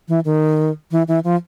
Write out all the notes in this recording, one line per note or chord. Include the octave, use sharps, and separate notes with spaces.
E3
D#3
E3
E3
F3